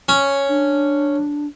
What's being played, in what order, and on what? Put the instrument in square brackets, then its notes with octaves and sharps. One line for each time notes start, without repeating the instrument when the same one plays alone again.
[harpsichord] C#4
[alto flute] D4